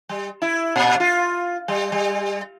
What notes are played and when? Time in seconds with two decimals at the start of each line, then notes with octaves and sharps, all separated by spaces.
0.09 G3
0.42 E4
0.76 A#2
1.00 F4
1.68 G3
1.92 G3